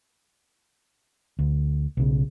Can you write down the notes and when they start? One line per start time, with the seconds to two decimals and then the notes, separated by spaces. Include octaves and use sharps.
1.39 D2
1.97 B1 C#3